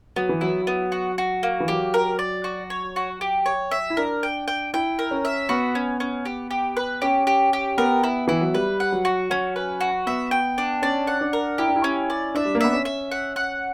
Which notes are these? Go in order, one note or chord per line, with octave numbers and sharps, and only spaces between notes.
F#3 B3
E3
F#3 E4
B3
F#4
F#4
A#3
E3
F#3 G4
A#4
D5
F#4
C#5
F#4
G4
C#5
E5
E4
D4 A#4
G5
G5
E4 G5
A#4
C#4
E5
B3 F#4
C#4
C#4
G4
G4
B4
C#4 G4
G4
G4
B3 A#4
E4
E3 E4
F#3
G3 B4
F#5
F#3
F#4
F#3 C#4
B4
F#4
B3 E5
G5
D4
C#4 D5
F#5
D4
A#4
E4 G4
D4
E4
C#4
D5
D4 E5
G3
A#3
B3 E5
C#4
E5
F#5
F#5